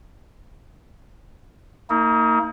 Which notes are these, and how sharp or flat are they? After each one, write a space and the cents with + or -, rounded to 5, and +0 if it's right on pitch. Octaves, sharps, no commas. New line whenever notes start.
A#3 -30 D#4 +30